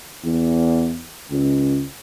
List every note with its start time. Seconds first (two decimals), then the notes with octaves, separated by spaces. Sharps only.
0.25 E2
1.31 C#2